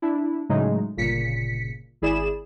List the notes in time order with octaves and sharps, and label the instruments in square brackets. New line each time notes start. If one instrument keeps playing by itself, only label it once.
[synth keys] D4 E4
A2 C#3 F#3 G#3 A3 D#4
G1 A#2 C#3 B6 C#7
G#1 E4 G#4 D5 B5 E7